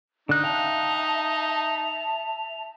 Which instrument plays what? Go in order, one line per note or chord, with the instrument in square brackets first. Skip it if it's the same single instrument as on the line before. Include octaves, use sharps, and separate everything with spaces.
[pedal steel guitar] D3 F#6 [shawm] D#4
[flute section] E5 A5 [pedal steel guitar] F5 G5 [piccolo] F7